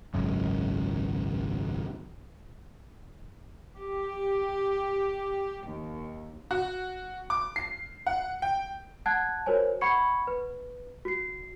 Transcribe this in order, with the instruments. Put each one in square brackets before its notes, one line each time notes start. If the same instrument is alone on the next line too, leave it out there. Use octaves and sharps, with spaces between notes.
[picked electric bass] G#1 C#2 F#2
[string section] G4
D#2
[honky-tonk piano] F#4
D6
C7
F#5
G5
[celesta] F#5 A5 F#6 G#6
F#4 A#4 C5 C#5 G#5
F#5 B5 C#6 G#6 C#7
B4
F#4 C7